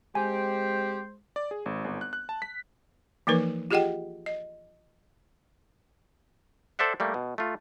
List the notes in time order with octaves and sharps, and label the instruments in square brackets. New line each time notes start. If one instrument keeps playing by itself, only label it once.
[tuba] G#3 [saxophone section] C4 G4 [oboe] C5 [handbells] G#5
[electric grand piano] D5
G#4
G#1
G1
F#6
F#6
A5
B6
[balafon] E3 F3 A#3 D#4 A#4 B4
F4 G4 G#4 D#5 F#5 G5
D#5
[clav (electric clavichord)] A4 C5 D5 E5 F#5
G3 A3 A#3
B2
A3 F4